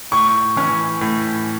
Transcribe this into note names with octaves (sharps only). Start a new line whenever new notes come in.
A2 C#6
E3 C#4
A2